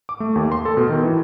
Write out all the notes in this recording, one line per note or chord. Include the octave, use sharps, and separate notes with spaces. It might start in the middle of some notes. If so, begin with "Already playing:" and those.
D6
A3
D#2
C6
A4
B2
D#3
E3